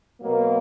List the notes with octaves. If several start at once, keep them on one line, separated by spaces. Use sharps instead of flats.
B2 F#3 A#3